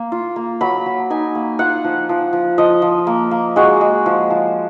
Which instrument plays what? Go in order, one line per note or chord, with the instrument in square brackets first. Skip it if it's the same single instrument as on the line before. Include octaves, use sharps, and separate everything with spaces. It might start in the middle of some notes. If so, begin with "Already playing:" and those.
Already playing: [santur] A#3
F4
A#3
F#3 B5
F#3
D#4 G#5
A#3
F4 F#5
F3
F3
F3
F3 D#5
F3
A#3
A#3
G#3 F#4
G#3
F3
F3